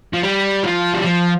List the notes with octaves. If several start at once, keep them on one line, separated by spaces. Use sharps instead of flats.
F3
G3
F3
G3
F3